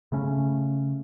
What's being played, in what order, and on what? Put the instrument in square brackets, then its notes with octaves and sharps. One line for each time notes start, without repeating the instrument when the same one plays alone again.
[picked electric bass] C#3 A3 C#4